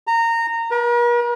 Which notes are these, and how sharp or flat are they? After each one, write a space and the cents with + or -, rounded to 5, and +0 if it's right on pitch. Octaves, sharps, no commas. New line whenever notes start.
A#5 -20
A#4 +45